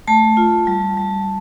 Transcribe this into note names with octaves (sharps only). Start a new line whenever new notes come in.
A3 A5
F4
G3
G3